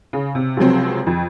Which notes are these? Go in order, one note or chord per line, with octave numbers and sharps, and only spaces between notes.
C#3
C3
C#2 C3 F3 F#3 C4
F2